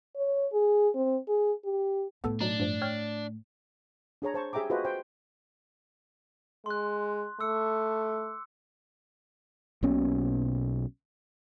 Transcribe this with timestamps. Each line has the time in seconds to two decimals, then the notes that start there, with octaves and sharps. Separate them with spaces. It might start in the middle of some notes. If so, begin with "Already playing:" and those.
0.16 C#5
0.53 G#4
0.95 C4
1.29 G#4
1.65 G4
2.24 A2 A3 B3 A4
2.41 B2 F#3 D4 D#4
2.60 G2 F3
2.82 C#5 G5 F6
4.22 D4 G#4 C#5 A#5
4.34 C5 A5 C#6
4.53 G4 G#4 E5 G5 A#5 D6
4.70 F4 F#4 G#4 B4 C5 D#5
4.85 C5 G5
6.66 G#3 C6 F#6
7.40 A3 D6 E6 C#7
9.83 B1 B2 A#3 C#4